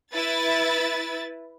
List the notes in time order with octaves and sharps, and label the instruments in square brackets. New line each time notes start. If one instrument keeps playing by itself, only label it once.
[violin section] E4 B4 A6